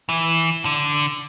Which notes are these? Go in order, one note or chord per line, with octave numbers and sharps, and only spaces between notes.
E3
D3